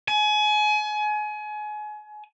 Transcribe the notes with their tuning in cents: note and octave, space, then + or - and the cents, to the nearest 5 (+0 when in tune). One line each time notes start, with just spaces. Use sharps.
G#5 +30